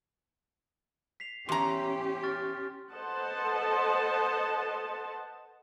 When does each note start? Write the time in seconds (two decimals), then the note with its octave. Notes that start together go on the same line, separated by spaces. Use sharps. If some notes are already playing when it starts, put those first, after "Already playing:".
1.20 B6 C7 F7
1.49 E2 C#4 G4 A#5 C6
2.23 C#6 F6 A6
2.92 A4 B4 C5 D#5 F#5 A5